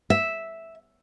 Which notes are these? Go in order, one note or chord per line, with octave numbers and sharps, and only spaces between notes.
E5